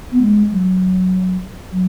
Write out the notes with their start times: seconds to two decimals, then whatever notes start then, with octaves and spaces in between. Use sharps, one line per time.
0.12 B3
0.21 G#3
0.52 F#3
1.72 F#3